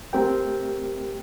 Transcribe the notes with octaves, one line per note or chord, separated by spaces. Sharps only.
A3 C4 G4 A#4 G5